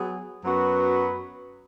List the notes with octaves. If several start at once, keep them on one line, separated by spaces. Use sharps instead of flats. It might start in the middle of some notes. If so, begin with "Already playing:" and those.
Already playing: F#3 B3 G#4
F#2 F#3 B3 F#4 B4